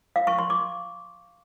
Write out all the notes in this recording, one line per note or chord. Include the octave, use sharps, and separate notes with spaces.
F5
C#6
C6
D6